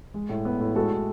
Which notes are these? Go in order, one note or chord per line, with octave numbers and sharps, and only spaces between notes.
G#3
A2
B3
A2
G#3 F#4 A4
A2